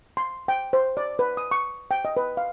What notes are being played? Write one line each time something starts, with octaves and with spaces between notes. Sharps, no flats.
C6
G5
C5
D5
B4
D#6
C#6
G5
D#5
B4
F5